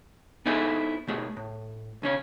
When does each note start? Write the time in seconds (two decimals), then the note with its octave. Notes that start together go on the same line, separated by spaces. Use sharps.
0.46 B3 D#4 E4 G#4 A4 C5
1.07 B2 A3 G#4
1.37 A2
2.02 B1 C#3 C#4 C#5